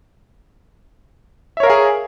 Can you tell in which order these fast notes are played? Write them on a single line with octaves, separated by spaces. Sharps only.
E5 C#5 A#4 F5 G#4